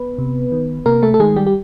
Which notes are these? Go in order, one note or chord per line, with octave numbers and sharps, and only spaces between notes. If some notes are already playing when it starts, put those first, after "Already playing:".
Already playing: B3 B4
C3
D#3
C3 A#3 A#4
A3 A4
A4
D#3 G#3 G#4
G3 G4
G4